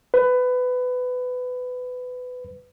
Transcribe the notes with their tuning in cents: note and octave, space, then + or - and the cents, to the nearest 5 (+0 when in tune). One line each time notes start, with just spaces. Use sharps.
B4 +20